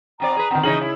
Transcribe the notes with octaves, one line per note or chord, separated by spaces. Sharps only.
B2 C4 D5 A#5
G#4 B4
D#3 B3 C4
C#3 E3 D#4 C#5 F#7
E4